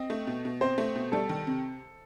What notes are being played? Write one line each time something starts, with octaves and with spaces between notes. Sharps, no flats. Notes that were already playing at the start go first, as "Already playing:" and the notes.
Already playing: C4 D#5
A3
B2
B2
C4 C5
A3
B2
G3 A4
D#3
C3